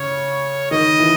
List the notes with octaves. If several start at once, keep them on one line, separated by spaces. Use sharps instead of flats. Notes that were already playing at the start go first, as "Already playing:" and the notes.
Already playing: C#3 C#5
D#3 D#5
E3